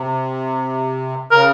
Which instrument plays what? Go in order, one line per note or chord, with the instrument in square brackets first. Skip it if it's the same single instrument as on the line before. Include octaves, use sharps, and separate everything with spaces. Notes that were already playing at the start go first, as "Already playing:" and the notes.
Already playing: [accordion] C3
[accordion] C#3 [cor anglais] A#4